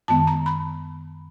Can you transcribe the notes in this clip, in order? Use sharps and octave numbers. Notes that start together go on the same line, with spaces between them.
F#2 D#3 G#3 B3 A5
A#5
B5